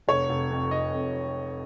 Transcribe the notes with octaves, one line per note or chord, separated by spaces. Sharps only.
F1 C#5
F1
F2
F1 D#5
F2